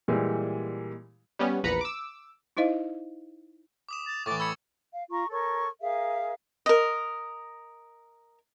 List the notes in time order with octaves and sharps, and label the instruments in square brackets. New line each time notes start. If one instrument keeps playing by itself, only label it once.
[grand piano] A#2 E3 G3 G#3
[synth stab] G3 B3 C#4
A#1 E2 B4 A#5 B5 C#7
D6 E6
[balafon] D#4 E4 C5 D#5 F5
[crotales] D6 D#6 E7
[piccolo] A6
[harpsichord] A2 E3 [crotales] C#6 A6 [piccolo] D6
[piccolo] B5 [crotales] E6 G#6 C#7
[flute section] F5
F4 A#5 C#6
A4 A#4 C#5 C#6
G#4 A#4 E5 F5
[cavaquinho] A#4 D#5